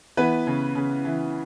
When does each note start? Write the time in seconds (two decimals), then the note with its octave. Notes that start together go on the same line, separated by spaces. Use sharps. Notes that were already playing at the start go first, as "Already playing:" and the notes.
0.17 E3 B3 B4
0.47 C#3
0.75 C#3
1.05 E3